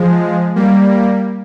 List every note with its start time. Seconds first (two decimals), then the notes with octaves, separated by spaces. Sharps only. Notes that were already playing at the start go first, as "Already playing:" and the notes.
Already playing: F3 G#3
0.56 G3 A#3